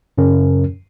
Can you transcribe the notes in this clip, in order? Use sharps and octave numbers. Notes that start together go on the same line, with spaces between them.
F#2 C#3 C#4 A#4